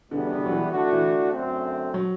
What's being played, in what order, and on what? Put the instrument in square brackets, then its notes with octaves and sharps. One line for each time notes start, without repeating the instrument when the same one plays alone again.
[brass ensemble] E2 B2 G3 B3 [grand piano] D3
[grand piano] D3
F#3
E3
[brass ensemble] D3 A3 D4 F#4
[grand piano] E3
[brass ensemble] F#2 D3 A3 C4
[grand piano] F#3